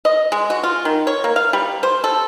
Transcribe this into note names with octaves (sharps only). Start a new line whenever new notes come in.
D#5
G#3
F#4
F4
D#3
C#5
A#3
F5
G3
C5
A4